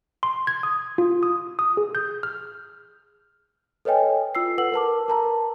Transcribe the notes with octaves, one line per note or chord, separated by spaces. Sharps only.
C6
G#6
D#6
F4
D#6
D#6
G#4
G6
F6
A4 B4 C#5 D#5 G5 G#5
F4 E6 C7
A4 B4 F#5 E6 F#7
A#4 B4 A5 D6
A#4 A5 A#5